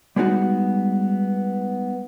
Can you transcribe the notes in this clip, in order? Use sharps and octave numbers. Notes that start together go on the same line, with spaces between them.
G3 G#3 B3 D#4 F#4